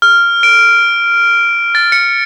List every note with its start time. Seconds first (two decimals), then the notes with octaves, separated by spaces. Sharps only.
0.02 F6
0.43 D7
1.75 A6
1.92 C#7